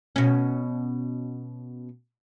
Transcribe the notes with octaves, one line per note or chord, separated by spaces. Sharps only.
B2 C#4